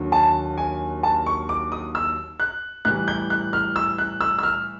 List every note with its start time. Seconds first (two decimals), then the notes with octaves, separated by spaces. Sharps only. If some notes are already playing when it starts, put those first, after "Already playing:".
Already playing: D#2 D3 F#3 A#3
0.12 A5
0.58 G#5
1.03 A5
1.26 C#6
1.49 D6
1.72 D#6
1.95 E6
2.40 F#6
2.85 A2 E3 G3 F#6
3.08 G6
3.30 F#6
3.53 F6
3.76 E6
3.98 F#6
4.21 E6
4.39 E6
4.43 F6